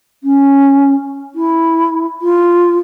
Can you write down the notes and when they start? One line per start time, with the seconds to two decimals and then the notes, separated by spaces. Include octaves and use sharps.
0.24 C#4
1.35 E4
2.22 F4